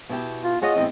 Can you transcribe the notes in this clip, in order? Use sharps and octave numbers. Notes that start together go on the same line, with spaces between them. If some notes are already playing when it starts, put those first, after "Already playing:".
B2 E4 G4
F4
F4 G#4 C#5 D#5 F#5
E2 A2 C4